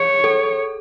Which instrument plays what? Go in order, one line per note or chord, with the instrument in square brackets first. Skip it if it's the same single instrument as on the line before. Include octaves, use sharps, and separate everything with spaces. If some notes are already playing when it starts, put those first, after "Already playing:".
Already playing: [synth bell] G#4 [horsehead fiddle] C#5
[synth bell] A4